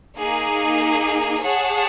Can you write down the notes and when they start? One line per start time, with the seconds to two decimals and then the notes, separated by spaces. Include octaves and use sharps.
0.17 A#3 D#4 G#4
1.42 G#4 C#5 F#5 A5